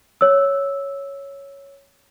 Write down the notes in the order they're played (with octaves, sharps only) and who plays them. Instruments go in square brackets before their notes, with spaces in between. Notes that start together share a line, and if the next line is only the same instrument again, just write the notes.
[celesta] C#5 E6